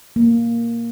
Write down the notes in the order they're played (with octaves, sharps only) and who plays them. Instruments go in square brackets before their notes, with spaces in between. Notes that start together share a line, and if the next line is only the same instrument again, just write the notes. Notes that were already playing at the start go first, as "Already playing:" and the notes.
[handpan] A#3